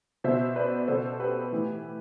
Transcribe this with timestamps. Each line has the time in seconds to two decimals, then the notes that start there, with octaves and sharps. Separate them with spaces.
0.24 B2 C5 E5
0.56 B4 D5
0.88 B2 A4 C5
1.20 G4 B4
1.52 A2 E3